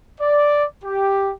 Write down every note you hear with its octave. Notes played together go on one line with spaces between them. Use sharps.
D5
G4